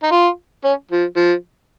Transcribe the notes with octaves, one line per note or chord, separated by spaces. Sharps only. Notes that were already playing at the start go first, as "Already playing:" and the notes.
D#4
F4
C#4
F3
F3